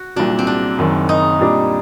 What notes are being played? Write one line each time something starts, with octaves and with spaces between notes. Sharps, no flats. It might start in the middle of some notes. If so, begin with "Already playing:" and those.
Already playing: F#4
C2 A#2 F#3 D4
C4
D4
F#1 F#2 D#3
D#4
A#2 G3 D4